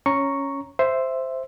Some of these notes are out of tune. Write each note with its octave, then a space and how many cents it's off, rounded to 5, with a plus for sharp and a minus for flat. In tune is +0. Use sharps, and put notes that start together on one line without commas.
C#4 +0 A#5 +0 C#6 +0
C5 +0 E5 +5